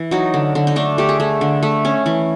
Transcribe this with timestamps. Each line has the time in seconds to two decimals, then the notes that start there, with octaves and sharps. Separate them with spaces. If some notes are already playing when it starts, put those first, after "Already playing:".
Already playing: E3
0.11 F#3 D#4
0.34 D3
0.55 D3
0.67 D#4
0.76 A3 D4
0.98 A3 G4
1.09 G#4
1.20 A3
1.41 D3
1.63 A3
1.85 C#4
2.06 E3